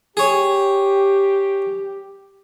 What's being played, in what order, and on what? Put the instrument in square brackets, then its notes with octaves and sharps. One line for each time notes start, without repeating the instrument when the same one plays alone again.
[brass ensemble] G4 [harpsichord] G#4 C#5